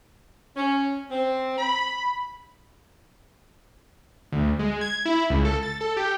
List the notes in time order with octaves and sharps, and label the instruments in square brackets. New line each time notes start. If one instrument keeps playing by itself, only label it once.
[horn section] C#4
C4
B5
[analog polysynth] D2
G#3
G#6
E4
C#2
A4
A6
A4
G4